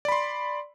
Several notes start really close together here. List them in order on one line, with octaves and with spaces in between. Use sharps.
D5 B5 C6